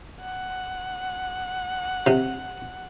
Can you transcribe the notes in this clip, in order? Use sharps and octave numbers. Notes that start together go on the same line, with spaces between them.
F#5
C3